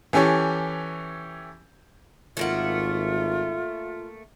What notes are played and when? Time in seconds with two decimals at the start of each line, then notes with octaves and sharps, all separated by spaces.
0.13 E3 C#4 G4 A4 C#5
2.37 G#1 A3 A#3 F4 F#5